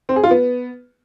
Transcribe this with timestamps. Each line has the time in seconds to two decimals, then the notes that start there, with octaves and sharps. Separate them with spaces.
0.09 C4
0.16 G#4
0.23 F4
0.31 B3